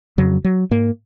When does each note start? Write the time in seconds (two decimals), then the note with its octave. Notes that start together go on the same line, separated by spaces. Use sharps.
0.18 F2 C#3 F#3
0.44 F#3
0.71 G#2 A#3